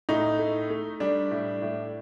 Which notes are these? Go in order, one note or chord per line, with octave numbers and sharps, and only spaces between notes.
A2 D#4
A3
A3
G3 D4
A2
A2